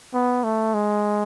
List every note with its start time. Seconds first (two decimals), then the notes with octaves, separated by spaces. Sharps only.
0.14 B3
0.44 A3
0.74 G#3